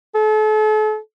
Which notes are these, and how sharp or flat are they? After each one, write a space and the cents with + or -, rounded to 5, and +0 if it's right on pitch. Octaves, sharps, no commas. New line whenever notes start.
A4 -40